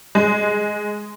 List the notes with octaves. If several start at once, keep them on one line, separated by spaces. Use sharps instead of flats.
G#3